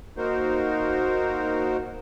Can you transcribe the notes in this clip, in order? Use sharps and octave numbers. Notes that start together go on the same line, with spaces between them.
A#3 D#4 F#4 A#4 C5